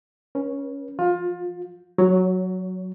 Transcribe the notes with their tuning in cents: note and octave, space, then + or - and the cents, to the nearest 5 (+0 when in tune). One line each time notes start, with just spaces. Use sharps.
C#4 +0 B4 -40
F3 +0 F4 +25
F#3 +0 C#5 +25